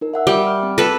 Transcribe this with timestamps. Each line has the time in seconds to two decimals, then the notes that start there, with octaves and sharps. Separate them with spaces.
0.01 D#4 A#4
0.14 E5 F#5 E6
0.27 G3 E5 D6
0.47 F6
0.63 C4
0.78 A4 B4